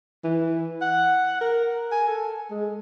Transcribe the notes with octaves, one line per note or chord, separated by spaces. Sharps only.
E3
F#5
A#4
G#5
A4
G#3